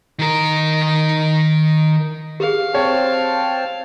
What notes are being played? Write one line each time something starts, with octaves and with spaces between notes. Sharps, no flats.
D#3 A#4
G4 G#4 F5
C4 C#5 G5 A5